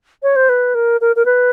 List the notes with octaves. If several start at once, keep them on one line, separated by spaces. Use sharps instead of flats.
C#5
C5
B4
A#4
A#4
A#4
B4